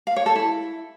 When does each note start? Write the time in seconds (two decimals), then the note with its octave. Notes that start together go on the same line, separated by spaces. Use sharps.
0.07 F5
0.16 C#5
0.26 A4
0.36 E4